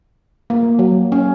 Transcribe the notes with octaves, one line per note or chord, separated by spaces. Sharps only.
A#3
F#3
C#4